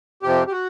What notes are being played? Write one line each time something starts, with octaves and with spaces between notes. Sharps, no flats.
F2 C3 F3 G4
G4
F#4